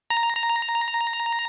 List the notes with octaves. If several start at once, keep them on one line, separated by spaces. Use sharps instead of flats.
A#5
A#5